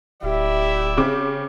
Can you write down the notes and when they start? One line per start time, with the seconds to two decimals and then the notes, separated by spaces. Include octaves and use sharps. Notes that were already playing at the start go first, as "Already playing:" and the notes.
0.23 D1 E4 G4 D5 E5
0.97 C#3 C4 D6